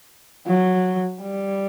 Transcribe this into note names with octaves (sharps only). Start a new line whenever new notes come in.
F#3
G3